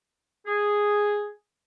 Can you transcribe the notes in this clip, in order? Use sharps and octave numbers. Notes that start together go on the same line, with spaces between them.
G#4